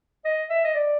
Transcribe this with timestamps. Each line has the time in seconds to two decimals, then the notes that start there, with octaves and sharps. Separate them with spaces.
0.25 D#5
0.50 E5
0.64 D#5
0.74 D5